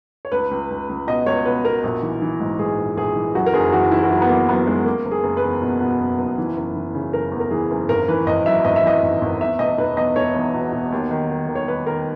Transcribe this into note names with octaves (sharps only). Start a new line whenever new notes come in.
C#5
C#2 B4
C#2
C#2
C#2
B2 D#5
C#2 C#5
B2 B4
B2 A#4
A#1
E3
E3
G#2
G#2 G#4
A#1
A#1 G#4
E3
F#2 F#4
A#4
F#1 G#4
E3 F#4
E3 E4
F#4
F#2 E4
B3
F#2 A#3
F#2 B3
F#2 G#3
F#1 A#3
F#1
G#4
F#1
B4
E2
B2
B2
F#1
F#1
E3
F#1
E3
C#3
F#1 A#4
E2
A#4
E3 G#4
F#1
G#1 A#4
E3 B4
G#1 D#5
F#2 E5
G#1 D#5
E5
E3 D#5
G#1
G#1
E2 E5
E1 D#5
E1 B4
E2 D#5
E1 C#5
E2
B2
B2
D#2
D#3
D#3
D#3
C#5
D#3 B4
D#3 A#4